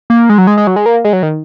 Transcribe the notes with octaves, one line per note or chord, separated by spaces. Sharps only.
A#3
G#3
F#3
G#3
G#3
F#3
G#3
A#3
G#3
F#3
D#3